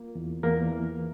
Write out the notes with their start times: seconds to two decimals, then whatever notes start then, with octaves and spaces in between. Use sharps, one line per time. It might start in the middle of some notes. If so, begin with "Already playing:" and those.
Already playing: A#3 F4
0.15 E2
0.43 E2 A#3 A#4
0.71 E3